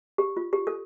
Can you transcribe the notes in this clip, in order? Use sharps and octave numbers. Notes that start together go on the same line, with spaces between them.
G4
F4
G4
A4